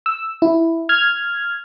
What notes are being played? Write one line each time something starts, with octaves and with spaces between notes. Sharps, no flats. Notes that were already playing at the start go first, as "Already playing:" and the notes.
E6
E4
F6 G#6